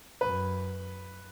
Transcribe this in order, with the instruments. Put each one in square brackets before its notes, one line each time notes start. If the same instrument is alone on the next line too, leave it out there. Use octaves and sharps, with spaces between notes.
[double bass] F#2 [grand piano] B4